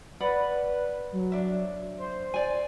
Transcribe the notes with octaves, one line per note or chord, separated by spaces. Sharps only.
B4 D5 F#5 B5
F#3
D4 E5
C5
D5 G#5